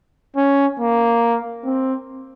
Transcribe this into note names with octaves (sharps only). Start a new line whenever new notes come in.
C#4
A#3
C4